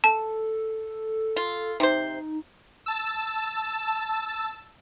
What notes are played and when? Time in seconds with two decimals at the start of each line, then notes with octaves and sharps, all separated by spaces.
0.04 A4 A5
1.36 F4
1.80 C3 D#4 C5
2.86 A5 E6